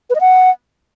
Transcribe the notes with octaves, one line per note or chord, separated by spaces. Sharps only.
B4
D#5
F#5